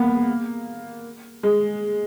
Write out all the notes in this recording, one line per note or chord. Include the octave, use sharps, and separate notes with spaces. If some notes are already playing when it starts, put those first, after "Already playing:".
Already playing: A#3 B3
G#3